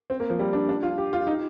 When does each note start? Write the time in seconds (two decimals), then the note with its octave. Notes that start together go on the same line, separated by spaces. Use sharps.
0.10 C4
0.20 A#3
0.30 F3
0.39 G3
0.53 D4
0.69 D4
0.83 F4
0.98 G4
1.13 F4
1.27 D#4